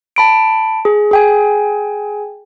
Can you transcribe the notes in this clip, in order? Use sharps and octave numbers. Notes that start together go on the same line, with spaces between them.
A5 B5 D7
G#4
G#4 G5 G#5